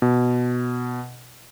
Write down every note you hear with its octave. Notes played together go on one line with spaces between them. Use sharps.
B2